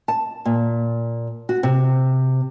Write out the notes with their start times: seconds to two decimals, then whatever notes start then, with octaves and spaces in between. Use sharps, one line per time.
0.08 A5
0.45 A#2
1.49 F#4
1.63 C3